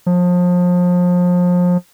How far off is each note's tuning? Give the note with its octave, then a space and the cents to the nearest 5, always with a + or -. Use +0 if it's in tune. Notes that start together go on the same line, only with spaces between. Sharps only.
F3 +30